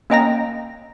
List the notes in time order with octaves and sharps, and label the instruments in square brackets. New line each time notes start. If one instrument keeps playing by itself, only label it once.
[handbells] A#3 C#4 D#5 G5 A#5 A#6